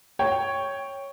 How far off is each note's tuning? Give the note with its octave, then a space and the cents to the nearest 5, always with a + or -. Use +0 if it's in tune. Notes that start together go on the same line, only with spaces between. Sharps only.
C#5 +0 G5 +0